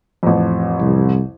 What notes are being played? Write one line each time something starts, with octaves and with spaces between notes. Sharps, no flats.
A1 F2
C2